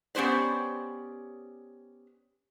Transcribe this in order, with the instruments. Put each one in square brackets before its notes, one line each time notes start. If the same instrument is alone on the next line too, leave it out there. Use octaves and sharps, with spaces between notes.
[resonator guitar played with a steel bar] B3 C#4 G4 C5 D5